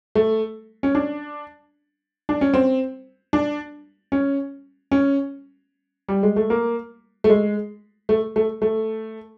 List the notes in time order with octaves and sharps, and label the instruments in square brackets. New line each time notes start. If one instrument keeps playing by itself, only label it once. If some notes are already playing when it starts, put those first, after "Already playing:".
[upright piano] A3
C#4
D4
D4
C#4
C4
D4
C#4
C#4
G3
G#3
A3
A#3
A3
G#3
A3
A3
A3